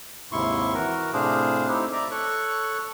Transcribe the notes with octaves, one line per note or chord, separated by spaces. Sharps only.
D#2 G#2 C3 E4 C6 C#6
E3 F#4 A#4
A2 C3 D4 G#4 C5 F5
A3 C4 D#4 E4 G4
D5 E5 A#5 D6
A4 C#5 C#6 F#6